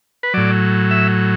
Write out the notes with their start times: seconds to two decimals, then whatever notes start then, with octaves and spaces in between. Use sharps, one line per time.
0.23 B4
0.34 A2 F#3 D5
0.91 E5